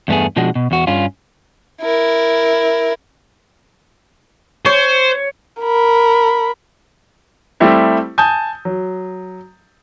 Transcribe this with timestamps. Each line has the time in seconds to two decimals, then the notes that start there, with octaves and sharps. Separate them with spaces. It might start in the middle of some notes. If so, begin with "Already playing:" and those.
0.08 E2 G2 A3 B3 G#4
0.36 B2 F3 G#3 D4 F#4
0.55 B2
0.71 E2 F#4
0.87 G2 C#4 F4
1.82 E4 A#4
4.66 C5 C#5
5.61 A#4 B5
7.60 G3 A3 C4 E4 G4
8.18 G#5 A5 D#6 G6
8.65 F#3